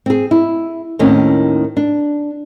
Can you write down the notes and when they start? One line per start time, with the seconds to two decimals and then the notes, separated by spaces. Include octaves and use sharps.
0.06 C4 G#4
0.31 E4
0.99 D#2 A2 D#3 C4 C#4
1.77 D4